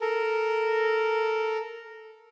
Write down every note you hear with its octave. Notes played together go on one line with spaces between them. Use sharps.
A4 A#4